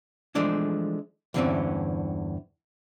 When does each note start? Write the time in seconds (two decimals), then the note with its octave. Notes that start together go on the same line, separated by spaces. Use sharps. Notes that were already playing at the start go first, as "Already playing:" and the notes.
0.35 E3 F3 G#3 A3 D4 E4
1.34 E2 G2 D3 E3 C4 C#4